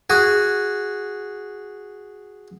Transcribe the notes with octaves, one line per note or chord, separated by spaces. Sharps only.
F#4 G#4